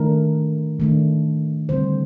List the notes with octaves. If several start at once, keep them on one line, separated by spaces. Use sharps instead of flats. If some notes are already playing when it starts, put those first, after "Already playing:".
Already playing: D#3 A3 D4 A#4
D#3 A3 D4
D3 G3 C4 C5